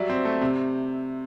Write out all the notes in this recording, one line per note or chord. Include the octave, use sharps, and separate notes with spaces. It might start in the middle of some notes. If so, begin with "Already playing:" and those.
Already playing: F#3 G3 D5 E5
C4
A3
C3